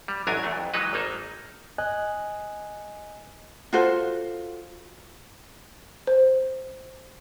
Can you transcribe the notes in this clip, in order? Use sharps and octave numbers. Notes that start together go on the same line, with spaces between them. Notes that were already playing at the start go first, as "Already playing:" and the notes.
G3
A1 F#2 F#3 D4 A#4 G#5
E2 E3 A3
F2
E3 F#3 G#3 D#4 B4
G#1 A#3 D#4 A4
D#5 G#5 F#6
F4 F#4 A4 C5
C5